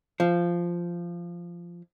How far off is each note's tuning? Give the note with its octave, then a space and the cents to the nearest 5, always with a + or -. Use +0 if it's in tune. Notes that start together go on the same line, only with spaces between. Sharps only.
F3 -10